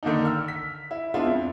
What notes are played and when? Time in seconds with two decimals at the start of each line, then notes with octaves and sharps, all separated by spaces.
0.03 D3 D#3 A#3 D4 D#4
0.25 E6 F6
0.48 B6
0.91 E4
1.14 G#3 B3 D4 E4 F4
1.27 F2